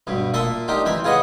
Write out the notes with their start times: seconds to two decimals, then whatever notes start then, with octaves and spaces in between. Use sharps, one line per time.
0.07 G2 B2
0.34 A#2 E5 A5 C6 D#6
0.68 D4 D#4 F4 G4
0.85 E3 C4 E5
1.04 F4 G#4 B4 C#5 D#5 F#5